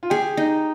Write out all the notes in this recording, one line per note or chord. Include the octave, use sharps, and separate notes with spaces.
F4
G4 G#4
D#4